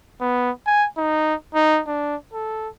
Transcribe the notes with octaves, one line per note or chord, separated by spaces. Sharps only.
B3
G#5
D#4
D#4
D4
A4